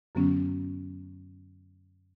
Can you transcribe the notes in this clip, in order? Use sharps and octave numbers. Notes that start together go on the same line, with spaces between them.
F#2 D3 F#3 B3 C#4